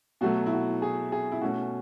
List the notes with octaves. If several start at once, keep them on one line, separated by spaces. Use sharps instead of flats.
B2 F#3 A3 F#4
E4
F#4
G#4
G#4
E4
B2 A3 C#4 F#4